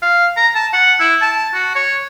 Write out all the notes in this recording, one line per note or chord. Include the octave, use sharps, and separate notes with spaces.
F5
A#5
A5
F#5
E4
A5
F#4
C#5